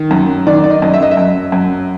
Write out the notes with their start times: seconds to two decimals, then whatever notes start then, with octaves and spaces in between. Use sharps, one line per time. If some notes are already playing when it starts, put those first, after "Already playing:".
Already playing: D#3
0.11 F#2
0.47 D#3 D5
0.64 D5
0.70 D#5
0.82 F#2
0.94 E5
1.03 D#5
1.11 E5
1.17 F#2
1.52 F#2